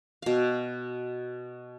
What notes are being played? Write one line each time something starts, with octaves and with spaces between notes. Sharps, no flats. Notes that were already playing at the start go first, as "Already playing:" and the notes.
B2 F5